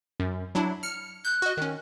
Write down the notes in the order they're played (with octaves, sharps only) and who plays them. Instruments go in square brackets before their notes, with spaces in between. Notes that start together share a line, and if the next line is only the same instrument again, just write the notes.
[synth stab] F#2
F#3 D4 E4
F6 C#7
[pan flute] F#6 [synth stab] G6
[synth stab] F#4 D#5
D#3 C#4